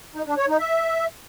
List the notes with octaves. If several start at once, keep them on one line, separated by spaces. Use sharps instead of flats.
D#4
D4
C#5
D#4
E5